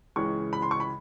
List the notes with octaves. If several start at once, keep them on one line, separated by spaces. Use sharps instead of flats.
C#2 C#3 E3 G#3 C#6
B5
C6
C#6
B5